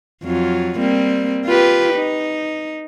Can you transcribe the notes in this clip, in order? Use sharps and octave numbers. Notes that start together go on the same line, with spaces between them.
F2 F#3 F4
G3 A#3 C4
F4 G4 B4
D#4